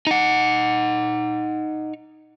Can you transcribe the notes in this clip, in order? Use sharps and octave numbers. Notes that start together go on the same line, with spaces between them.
D#4 F#5